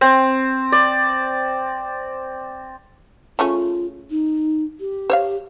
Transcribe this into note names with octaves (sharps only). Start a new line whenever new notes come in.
C4
D5
C#3 A3 C#4 F4
D#4
G4
C5 C#5 F5